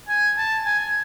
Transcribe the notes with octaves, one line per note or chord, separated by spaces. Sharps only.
G#5
A5
G#5